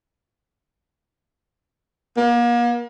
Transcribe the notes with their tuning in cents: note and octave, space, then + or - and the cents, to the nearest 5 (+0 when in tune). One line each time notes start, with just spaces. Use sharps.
A#3 +40